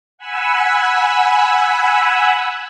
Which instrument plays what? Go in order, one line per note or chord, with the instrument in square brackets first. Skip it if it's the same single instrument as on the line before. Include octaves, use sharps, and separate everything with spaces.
[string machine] F#5 G#5 B5 E6